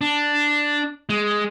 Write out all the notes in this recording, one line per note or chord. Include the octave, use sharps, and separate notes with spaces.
D4
G#3